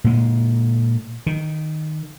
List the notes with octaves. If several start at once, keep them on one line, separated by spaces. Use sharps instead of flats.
A#2 G#3
D#3